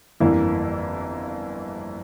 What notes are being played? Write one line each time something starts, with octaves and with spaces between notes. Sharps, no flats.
G1 F2 E3 A#3 E4